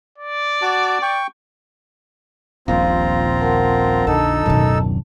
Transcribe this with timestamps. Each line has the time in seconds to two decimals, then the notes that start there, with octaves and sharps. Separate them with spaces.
0.18 D5
0.62 F#4 A5 D6
1.02 G5 C#6
2.68 D#1 A#1 C4 F4 F5 A#5
3.41 A#4 F#5 A5
4.07 A#1 F2 D3 D#4 A4 A5 E6
4.46 D1 F#2 B2 D#3